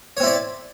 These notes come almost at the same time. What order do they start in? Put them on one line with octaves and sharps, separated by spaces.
C#5 C4 E4 D5